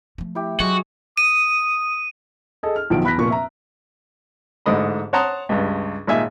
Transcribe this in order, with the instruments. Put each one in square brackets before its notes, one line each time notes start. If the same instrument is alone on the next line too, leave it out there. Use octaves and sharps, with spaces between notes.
[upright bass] F3 A3
[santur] E4 G4
[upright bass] F#3 [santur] G#3 C#5 [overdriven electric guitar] F#4
[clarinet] D#6 [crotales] D#7
[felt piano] G#4 A4 D#5
F6
B1 D#3 F3 D7
E2 B5 F#6 A#6 B6
F1 A#2 C#6
E5 A#5
[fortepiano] A1 G#2 D3 D#5 B5
C#5 F#5 A5 A#5 C6 D#6
C#2 G2
G#1 A#2 D#4 E5 G#5